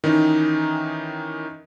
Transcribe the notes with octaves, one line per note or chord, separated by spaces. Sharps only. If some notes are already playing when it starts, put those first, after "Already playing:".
D#3 E3 C#4 D#4